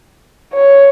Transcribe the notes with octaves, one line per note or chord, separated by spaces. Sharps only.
C#5